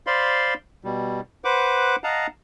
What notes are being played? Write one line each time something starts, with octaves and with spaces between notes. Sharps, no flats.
C5 D5 F5 B5 C6
B2 G3
B4 C5 F#5 D6
D#5 F5 F#5 A5 A#5